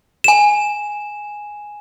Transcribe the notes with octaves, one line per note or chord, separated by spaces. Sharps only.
G#5 E7